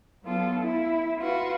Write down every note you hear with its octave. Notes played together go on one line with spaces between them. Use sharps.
F#3 B3 F4 A4
E4
F4 F#4 B4